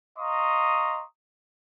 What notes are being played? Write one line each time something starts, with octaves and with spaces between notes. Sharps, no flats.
D#5 F5 A#5 C6 C#6 D#6